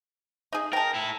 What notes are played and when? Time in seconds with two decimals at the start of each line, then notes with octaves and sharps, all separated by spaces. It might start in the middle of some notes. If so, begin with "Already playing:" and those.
0.53 D#4 G#4
0.73 A#4 G5 A5
0.94 E4 A4